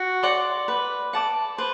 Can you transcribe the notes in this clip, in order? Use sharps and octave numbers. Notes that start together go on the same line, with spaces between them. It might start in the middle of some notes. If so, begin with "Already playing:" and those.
Already playing: F#4
D5 F#5 C6
B4
F#5 A5 D6
B4 C5